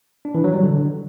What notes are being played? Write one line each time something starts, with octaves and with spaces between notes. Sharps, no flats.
D4
E3
F#3
G3
D3